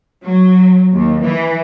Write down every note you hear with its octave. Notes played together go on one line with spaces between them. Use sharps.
F#3
D#2
E3